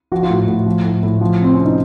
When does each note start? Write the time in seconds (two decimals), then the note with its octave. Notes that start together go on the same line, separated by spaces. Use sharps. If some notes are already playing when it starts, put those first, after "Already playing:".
0.12 F3 F#4
0.23 F4
0.30 A2 F#4
0.47 A2
0.66 F3
0.84 A2
1.03 A2
1.21 F3
1.40 C3 C4
1.55 C3 C#4
1.66 D#4